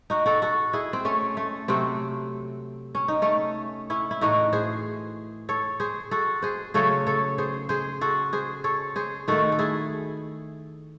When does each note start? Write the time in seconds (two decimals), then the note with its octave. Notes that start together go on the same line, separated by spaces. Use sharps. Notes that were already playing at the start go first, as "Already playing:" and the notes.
0.10 D#4 F#4
0.26 F#4 A4
0.42 F#4 A4
0.73 E4 G#4
0.93 C4
1.05 A3 C#4
1.37 A3
1.68 C3 F#3 A3 C4
2.95 C#4
3.08 D#4
3.22 A3 C#4
3.90 C#4 E4
4.11 E4
4.21 A2 E3 A3 D#4 F#4
4.53 G#4 C5
5.49 A4 C#5
5.80 G#4 C5
6.11 F#4 A4
6.42 G#4 C5
6.74 C#3 F#3 A3 A4 C#5
7.07 A4 C#5
7.38 G#4 C5
7.69 G#4 C5
8.01 F#4 A4
8.33 G#4 C5
8.64 A4 C#5
8.96 G#4 C5
9.28 D#3 A3 F#4 A4
9.52 A4
9.59 E4 G#4